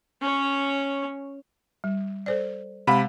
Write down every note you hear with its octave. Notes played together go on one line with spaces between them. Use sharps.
C#4 C#5
G3
A4 C5 D5
C3 G#3 F5 F#5 B5